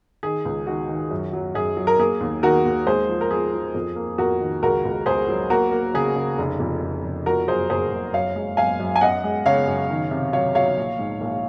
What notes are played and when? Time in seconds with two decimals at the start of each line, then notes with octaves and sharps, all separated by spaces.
0.23 D#3 G#4
0.45 C#2
0.67 D#3 F#4
0.89 D#3
1.11 F#2
1.33 F#3
1.55 F#2 G#4
1.77 F#3
1.87 A#4
1.99 A#3 G#4
2.21 D#2
2.43 D#3 F#4 A#4
2.65 D#2
2.86 G#3 G#4 C5
3.09 F3
3.21 A#4
3.31 F3 G#4
3.53 F3
3.75 F2
3.96 A#3
4.18 F2 F#4 A#4
4.40 D#3
4.63 C#2 F#4 A#4
4.85 C#2
5.06 C#2 G#4 C5
5.29 F#3
5.50 A#3 F#4 A#4
5.72 A#3
5.94 C#3 G#4
6.16 C#3
6.38 F1
6.60 F2
6.82 F1
7.04 F1
7.26 F3 F#4 A#4
7.48 F#2 G#4 C5
7.70 F#1 G#4 C5
7.91 F#1
8.14 F#2 C#5 F5
8.36 G#3
8.57 F#2 F5 G#5
8.80 F#2
8.96 G#5
9.01 F#2 D#5 F#5
9.24 G#3
9.46 C#3 C#5 F5
9.68 F#2
9.90 D#3
10.11 C3
10.33 F#3 C#5 F5
10.55 F#3 C#5 F5
10.77 A#1
10.99 G#2
11.21 A#1